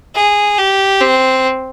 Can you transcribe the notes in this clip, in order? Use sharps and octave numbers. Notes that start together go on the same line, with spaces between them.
G#4
G4
C4